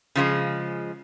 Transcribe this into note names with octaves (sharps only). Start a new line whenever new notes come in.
C#3 F3 G#3